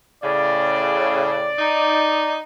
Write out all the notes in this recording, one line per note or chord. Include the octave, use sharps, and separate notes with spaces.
A2 C#3 D5
D#4